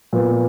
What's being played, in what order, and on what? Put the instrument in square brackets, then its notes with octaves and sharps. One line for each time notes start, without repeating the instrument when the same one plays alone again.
[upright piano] A#2 F3 B3